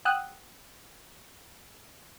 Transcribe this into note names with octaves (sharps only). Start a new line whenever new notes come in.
F#5 G5 D#6 E6 F#6